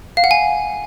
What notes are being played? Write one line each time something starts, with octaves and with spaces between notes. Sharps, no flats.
F5
F#5
G#5